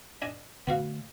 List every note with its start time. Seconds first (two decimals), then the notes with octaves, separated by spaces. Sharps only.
0.22 D4 D#5 G#5
0.67 D3 A3 B3 F#4 F5